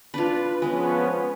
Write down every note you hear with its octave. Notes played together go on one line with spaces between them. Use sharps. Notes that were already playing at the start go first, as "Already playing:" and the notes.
D4 F4 B4
F3 G#3 B3 C#4